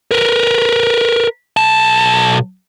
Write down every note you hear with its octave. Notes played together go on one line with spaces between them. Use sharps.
A#4 B4
B1 A5